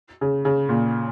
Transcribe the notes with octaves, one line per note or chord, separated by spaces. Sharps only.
C#3
C#3
A#2